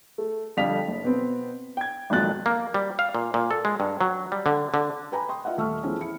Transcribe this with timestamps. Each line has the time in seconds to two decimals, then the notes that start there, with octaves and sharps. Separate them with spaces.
0.18 A3
0.57 F2 D3 G3 F5 B6 F7
0.88 F#1
1.04 B2 B3 C4
1.77 G5 G#6
2.10 G#1 F2 A#2 F#3 F#6 A6
2.46 A#3
2.74 G3
2.99 F5
3.15 A#2
3.34 A#2
3.51 A4
3.65 G#3
3.80 G2
4.01 F#3
4.32 G3
4.46 D3
4.74 D3
5.12 B4 G5 G#5 A#5 B5
5.29 G5 C6 D#6
5.45 F4 D#5 E5 F#5
5.57 D#1 A3 C#6 E6 F6
5.83 E2 E3 F3 A3 C4 C#4
6.00 E4 C#7